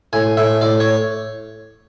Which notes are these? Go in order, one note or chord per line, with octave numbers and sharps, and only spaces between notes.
A2 G#5
A2 E5
A2 D5
C#5